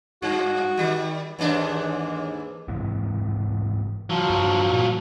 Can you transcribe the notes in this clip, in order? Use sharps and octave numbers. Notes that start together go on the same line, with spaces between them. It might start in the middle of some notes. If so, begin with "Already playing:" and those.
G2 F#4
D#3 G3
D#2 G#2 E3 D4
G#2 C3 E3
F3 F#3
G2
A#2